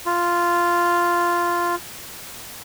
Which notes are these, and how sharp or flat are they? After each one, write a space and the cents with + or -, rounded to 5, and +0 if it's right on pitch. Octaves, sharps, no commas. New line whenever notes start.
F4 -5